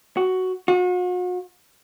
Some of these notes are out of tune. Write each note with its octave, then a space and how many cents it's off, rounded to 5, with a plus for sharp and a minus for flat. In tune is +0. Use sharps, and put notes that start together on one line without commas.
F#4 +5
F#4 -40